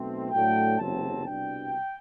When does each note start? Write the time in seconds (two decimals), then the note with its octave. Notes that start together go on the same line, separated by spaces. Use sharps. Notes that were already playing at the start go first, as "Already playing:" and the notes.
Already playing: B1 B2 A3 C4
0.31 A2 F#3 A3 D4 G5
0.78 F#1 E2 C3 F#3 C4 A5
1.26 C2 B2 G3 D4 G5